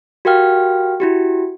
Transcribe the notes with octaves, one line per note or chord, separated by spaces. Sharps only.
F#4 G4 A#4 F5 G5 F6
E4 F#4 G4